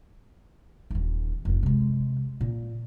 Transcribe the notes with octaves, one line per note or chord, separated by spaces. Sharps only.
D#1 D#3
F1 D#3
C3 G#3
A#2